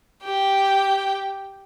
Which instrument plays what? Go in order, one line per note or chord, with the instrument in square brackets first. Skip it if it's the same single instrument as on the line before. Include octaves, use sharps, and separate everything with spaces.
[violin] G4 G5